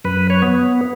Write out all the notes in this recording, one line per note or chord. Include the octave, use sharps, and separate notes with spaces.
F#2 B4
C#5
B3